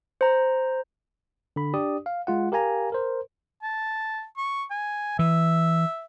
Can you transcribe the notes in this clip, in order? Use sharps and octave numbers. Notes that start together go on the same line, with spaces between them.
C5 A#5
D3 B5
D4 G4 D5 D#6
F5
G#3 F4 F#5
G4 A#4 F5 G#5 A#5
A#4 C5
A5
C#6
G#5
E3 E5